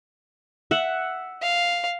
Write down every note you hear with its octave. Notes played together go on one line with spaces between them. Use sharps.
E5 F#5
F5